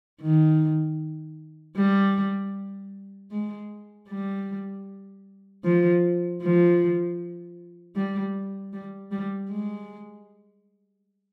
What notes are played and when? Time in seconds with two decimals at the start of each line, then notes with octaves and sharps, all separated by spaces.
0.21 D#3
1.77 G3
3.31 G#3
4.09 G3
5.64 F3
6.42 F3
7.96 G3
8.73 G3
9.12 G3
9.50 G#3